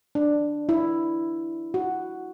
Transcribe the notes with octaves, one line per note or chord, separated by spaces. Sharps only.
D4
E4
F#4